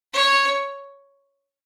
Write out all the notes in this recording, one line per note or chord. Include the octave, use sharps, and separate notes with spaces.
C#5